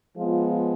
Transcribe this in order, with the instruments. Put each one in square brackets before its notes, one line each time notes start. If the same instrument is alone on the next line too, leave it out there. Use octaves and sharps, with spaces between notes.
[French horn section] F3 G#3 B3 F4